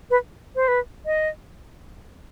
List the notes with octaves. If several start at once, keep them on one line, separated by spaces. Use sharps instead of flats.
B4
C5
B4
D#5